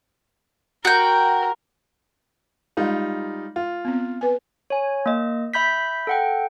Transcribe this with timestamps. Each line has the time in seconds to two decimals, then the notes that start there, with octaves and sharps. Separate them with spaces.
0.85 F#4 A#4 G5
2.77 G3 G#3 D#4 F4
3.56 F4
3.85 B3 C4
4.21 B4 G#5
4.70 C#5 G#5
5.06 A#3 D#5
5.54 E5 B5 G6 B6
6.07 A4 F#5 G5